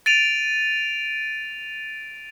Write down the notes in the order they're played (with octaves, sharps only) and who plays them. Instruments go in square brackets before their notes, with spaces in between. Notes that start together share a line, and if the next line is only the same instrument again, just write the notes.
[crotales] A6 D7 D#7 F7